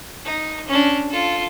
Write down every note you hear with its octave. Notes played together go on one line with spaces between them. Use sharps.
D#4
C#4 D4
F4 A4